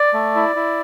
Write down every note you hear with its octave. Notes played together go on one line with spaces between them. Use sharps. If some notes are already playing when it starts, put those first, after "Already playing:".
Already playing: D5
A3
E4
E4